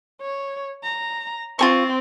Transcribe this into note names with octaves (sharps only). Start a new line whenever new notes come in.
C#5
A#5
C4 F4 G#4 C#6